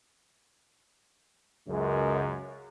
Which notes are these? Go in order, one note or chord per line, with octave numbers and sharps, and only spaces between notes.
C#2 F#2 G#3